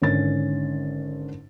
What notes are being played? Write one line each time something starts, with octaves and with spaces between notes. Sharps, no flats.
G#1 D3 C#4 A6